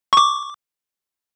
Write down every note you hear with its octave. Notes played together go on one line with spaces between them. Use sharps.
C#6 D6